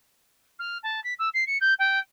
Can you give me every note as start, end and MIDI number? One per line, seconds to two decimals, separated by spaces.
0.59 0.78 89
0.83 1.03 81
1.04 1.14 95
1.19 1.29 88
1.34 1.44 96
1.47 1.58 97
1.61 1.74 91
1.79 1.99 79